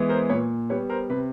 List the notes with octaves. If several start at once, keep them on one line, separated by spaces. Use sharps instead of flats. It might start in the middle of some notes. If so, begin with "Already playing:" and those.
Already playing: E3 G#3 B3
A#4 C5
A#2 B4 C#5
G3 B3 B4 C#5
A#4 C5
C3 B4